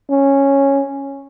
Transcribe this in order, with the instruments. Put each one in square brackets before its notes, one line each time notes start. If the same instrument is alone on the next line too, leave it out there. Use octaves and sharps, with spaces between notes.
[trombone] C#4